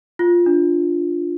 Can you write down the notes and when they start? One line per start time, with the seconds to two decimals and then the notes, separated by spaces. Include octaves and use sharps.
0.19 F4
0.46 D4